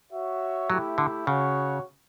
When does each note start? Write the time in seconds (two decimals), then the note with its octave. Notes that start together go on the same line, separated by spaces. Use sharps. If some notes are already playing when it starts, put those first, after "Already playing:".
0.12 F#4 C#5 E5
0.70 F#3 A3 E4 G4
0.98 D3
1.27 C#3 F#4 C#5 F#5